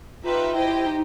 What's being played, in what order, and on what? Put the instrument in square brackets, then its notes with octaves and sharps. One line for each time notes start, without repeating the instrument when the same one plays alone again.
[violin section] D#4 G4 B4 E5 [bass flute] F4
[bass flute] E4 [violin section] G4 C5 D#5 G5
[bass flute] D#4